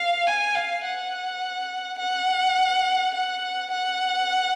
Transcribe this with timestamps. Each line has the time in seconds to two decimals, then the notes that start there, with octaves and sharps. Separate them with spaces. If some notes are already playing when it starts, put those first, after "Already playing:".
Already playing: F5
0.27 G#5
0.56 F5
0.84 F#5
1.99 F#5
3.14 F#5
3.71 F#5